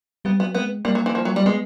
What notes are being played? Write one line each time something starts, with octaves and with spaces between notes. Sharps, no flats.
G3 B3
F#3 B3
G#3 B3
G3 A#3
F#3
E3
F3
F#3
G3
G#3 B3